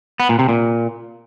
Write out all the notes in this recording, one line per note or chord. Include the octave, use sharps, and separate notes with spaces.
B3
A#2
C3
A#2